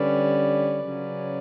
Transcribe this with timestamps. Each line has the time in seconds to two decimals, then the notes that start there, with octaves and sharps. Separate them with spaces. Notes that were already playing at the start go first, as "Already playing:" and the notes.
Already playing: D3 G3 C#4 B4 D5
0.79 C#3 F#3 C#4